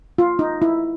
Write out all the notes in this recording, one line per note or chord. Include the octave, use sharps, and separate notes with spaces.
F4
D#4
E4